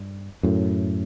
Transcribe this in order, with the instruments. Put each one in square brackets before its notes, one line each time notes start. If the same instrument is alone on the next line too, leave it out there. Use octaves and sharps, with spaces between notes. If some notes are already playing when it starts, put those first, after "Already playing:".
Already playing: [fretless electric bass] G2
F#2 A2